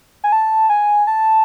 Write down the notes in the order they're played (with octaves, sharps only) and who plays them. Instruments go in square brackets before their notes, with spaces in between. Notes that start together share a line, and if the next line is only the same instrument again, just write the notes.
[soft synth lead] G#5
A5
G#5
A5